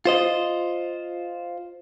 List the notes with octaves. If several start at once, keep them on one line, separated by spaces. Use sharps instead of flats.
F4 C5 D#5